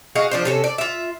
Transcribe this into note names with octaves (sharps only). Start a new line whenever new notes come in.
F#4 G#4 D#5 F5
F3 D4 C5
C3 C#4 A4
D5
F4 E5